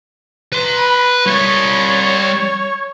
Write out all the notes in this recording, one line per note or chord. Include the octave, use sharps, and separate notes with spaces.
B4 C6
B5
G3 C#5 E5